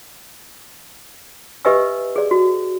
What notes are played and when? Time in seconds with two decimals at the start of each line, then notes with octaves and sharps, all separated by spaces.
1.65 G4 B4 D#5 E5 G#5 E6
2.16 G#4 D5
2.31 F#4